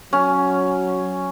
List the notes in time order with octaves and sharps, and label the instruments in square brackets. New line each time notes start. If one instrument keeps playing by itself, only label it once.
[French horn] F#3 [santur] C#4